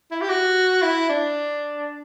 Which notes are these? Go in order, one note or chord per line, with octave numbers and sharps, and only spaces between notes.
E4
G4
F#4
E4
D4